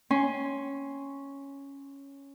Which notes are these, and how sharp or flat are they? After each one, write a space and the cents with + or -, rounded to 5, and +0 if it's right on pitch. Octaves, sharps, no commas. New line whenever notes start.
C#4 +0 C6 +0